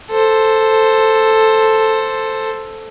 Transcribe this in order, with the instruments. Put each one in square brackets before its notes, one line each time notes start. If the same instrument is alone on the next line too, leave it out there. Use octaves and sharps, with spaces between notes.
[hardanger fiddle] A4 C5